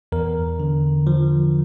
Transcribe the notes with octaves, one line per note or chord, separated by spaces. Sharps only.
E2 A#4
D3
F3